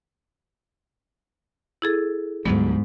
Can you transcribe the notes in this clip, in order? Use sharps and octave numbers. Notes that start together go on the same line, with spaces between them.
E4 G#4 A4
D2 G#2 F#3 G3 B3